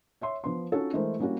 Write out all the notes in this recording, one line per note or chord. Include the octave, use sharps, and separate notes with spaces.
C#5 E5 C6
F3 B3 C6
C#4 D#4 F4 F#4 A4
E3 G#3 A3 G#4 A#4 C5
G3 A#3 C#4 E4 F#4